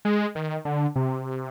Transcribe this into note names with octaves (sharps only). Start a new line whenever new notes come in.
G#3
D#3
D3
C3